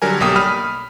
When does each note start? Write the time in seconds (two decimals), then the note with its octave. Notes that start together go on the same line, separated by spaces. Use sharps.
0.02 D3 F#3 G3 A#4 G#5
0.20 B1 G3 A#3 G5 D#6
0.36 B5 D#6 F6